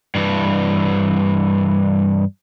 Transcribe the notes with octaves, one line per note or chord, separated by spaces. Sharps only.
G2 E3